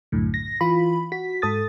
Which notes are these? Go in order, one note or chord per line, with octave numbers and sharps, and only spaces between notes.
C2 F#2 A2 D3
A#6
E3 F4 B5
F#4 B6
G#2 A4 D#6 A6